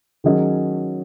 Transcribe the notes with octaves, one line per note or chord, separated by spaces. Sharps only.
D#3 F#3 C#4 G#4 D#5